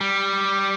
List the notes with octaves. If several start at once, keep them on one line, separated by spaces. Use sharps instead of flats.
G3